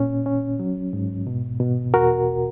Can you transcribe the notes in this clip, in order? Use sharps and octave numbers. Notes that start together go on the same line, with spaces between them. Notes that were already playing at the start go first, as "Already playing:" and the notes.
Already playing: A#2 C#4
C#4
F#3
G#2
B2
B2
E2 F#4 A#4